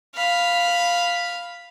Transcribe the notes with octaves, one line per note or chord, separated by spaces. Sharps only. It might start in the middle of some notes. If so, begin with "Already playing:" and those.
F5 B5